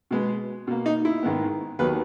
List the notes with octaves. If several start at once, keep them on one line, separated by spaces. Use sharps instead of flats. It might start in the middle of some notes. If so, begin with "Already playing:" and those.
B2 G#3 B3
B2 A#3
D#4
E4
G#2 D#3 G#3 B3
D#2 D#3 F#3 B3 B4